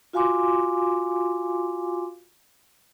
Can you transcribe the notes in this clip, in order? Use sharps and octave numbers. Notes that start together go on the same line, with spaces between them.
F4 F#4 F5 G#5 C6 D6